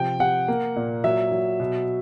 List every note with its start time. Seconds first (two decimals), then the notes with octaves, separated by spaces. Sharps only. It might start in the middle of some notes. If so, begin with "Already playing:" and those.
Already playing: C3 F3 G5
0.20 C3 F#5
0.48 A#3
0.76 A#2
1.04 F#3 E5
1.32 F#3
1.60 B2